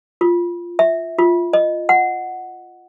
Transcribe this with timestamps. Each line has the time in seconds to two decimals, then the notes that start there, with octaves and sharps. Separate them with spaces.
0.21 F4
0.79 E5
1.18 F4
1.53 D#5
1.89 F#5